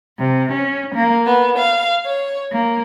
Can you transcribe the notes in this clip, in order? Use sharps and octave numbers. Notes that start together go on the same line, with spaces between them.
C3
C#4
A#3
B3
F5
C#5
A#3